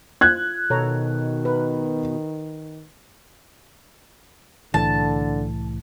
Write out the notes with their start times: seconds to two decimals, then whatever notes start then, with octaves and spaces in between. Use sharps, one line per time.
0.21 F4 F#6 G#6
0.70 B2 D#3 A4 C#5 A#5
1.45 A#4 B4
4.74 C2 A2 D3 E3 A5